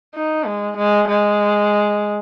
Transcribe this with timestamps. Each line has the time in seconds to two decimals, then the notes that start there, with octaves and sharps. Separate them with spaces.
0.15 D#4
0.46 G#3
0.78 G#3
1.09 G#3